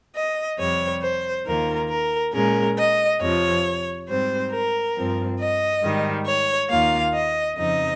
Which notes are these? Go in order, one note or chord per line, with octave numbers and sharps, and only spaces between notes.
D#5
F2 C3 G3 C#5
C5
D#2 D#3 A#3 F4 A#4
A#4
A#2 G#3 C#4 A#4
D#5
F2 C3 F3 C#5
G#2 G3 C4 C5
A#4
G2 F3 C4
D#5
G#2 D#3 G3
C#5
D#2 D#3 A#3 F4 F5
D#5
F2 C#3 F3 C4 D#4 D#5